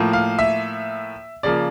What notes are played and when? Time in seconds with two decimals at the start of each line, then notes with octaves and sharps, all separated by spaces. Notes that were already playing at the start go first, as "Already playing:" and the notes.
Already playing: A2 F3 A#3
0.13 F5
0.39 E5
1.43 C#3 F3 A#3 D5